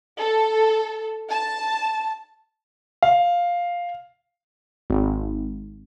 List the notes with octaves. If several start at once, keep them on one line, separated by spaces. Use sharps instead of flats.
A4
A5
F5
G#1